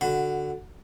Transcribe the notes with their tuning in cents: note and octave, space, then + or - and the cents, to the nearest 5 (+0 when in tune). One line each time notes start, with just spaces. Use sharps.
D3 +0 F#4 +0 B5 +35